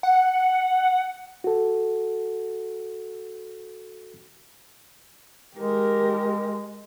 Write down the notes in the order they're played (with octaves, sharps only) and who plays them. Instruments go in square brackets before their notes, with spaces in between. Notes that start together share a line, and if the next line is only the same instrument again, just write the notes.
[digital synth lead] F#5
[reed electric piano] F#4 A4
[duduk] G#3 [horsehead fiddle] G4 A#4